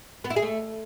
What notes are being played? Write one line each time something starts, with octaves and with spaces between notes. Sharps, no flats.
B3
E4
G#4
A3